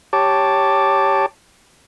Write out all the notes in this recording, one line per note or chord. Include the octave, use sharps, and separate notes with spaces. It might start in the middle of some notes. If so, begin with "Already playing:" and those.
G4 C#5 A5 D6